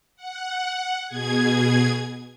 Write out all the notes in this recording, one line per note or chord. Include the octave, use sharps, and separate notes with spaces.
F#5
B2 G#4 G#6